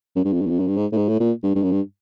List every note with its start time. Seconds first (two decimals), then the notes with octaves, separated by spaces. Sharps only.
0.16 F#2
0.24 G2
0.33 F2
0.41 G2
0.46 E2
0.50 F2
0.59 F#2
0.67 G2
0.77 G#2
0.92 A2
0.97 G#2
1.08 A2
1.20 A#2
1.43 G2
1.55 G2
1.63 F#2
1.72 G2